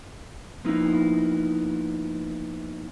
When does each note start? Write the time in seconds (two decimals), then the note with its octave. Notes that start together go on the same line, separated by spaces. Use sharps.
0.64 F3 A#3 B3 D#4 E4